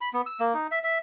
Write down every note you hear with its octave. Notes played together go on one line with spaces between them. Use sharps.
B5
B3
E6
A#3
D#4
E5
E5